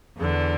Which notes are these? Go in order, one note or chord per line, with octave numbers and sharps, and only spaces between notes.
E2 D3